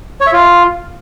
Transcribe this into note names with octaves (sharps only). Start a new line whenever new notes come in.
C#5
E5
F4